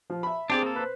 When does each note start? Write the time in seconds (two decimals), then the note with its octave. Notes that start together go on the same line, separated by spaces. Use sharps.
0.10 F3
0.23 E5 B5
0.50 C4 D4 G4 G#4 D5
0.63 A#3 A4
0.76 B4 C5